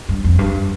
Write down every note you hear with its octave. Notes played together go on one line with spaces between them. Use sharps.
G2
F2
G2